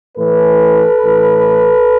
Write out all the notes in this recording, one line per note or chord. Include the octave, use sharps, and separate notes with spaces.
A2 E3 A4 B4
A2 E3